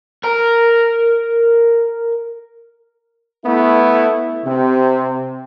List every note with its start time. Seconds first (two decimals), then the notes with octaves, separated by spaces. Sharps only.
0.24 A#4 A#5
3.45 A3 B3 E4
4.45 C3